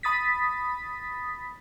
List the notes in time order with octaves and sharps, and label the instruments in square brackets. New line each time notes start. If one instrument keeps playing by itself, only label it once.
[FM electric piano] B5 D#6 A6 B6